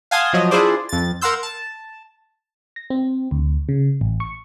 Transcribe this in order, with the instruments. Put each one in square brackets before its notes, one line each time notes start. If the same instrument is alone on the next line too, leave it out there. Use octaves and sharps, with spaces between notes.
[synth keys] F5 F#5 G#5 A5 C6 D#6
F3 F#3 D#5
D4 E4 F4 G#4 C5 D5
F2 A6
A#4 F5 F#5 C6 E6 G6
A5
[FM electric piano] A#6
C4
D2
C#3
A1
C#6